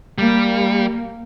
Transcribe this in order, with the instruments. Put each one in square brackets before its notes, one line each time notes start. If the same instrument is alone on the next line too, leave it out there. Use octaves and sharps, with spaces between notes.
[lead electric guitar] G3 [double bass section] A#3